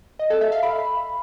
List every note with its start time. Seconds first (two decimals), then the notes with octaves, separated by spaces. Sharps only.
0.19 D#5
0.30 A4
0.41 E5
0.52 F5
0.63 B5